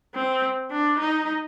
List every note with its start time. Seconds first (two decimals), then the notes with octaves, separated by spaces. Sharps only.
0.14 C4
0.71 D4
0.99 D#4